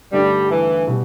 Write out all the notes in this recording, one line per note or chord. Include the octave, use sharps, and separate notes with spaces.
G2 D3 G3 A3 D4
E3
B2 G3